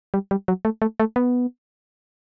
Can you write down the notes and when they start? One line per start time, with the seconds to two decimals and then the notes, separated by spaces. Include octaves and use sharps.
0.14 G3
0.31 G3
0.48 F#3
0.65 A3
0.82 A3
1.00 A3
1.16 B3